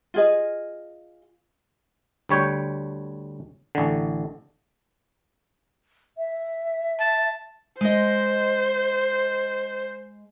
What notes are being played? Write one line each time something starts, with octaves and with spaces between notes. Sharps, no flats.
F4 G#4 D#5
D2 G3 C#5 G5
A1 D3
E5
A5
G#3 C5 D#5